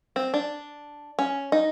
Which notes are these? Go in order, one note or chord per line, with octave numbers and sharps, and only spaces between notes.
C4
D4
C#4
D#4